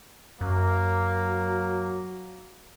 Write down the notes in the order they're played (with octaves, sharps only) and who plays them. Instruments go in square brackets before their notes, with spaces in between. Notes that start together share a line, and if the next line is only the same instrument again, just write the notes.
[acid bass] F#2 [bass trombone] F#3 [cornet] A#3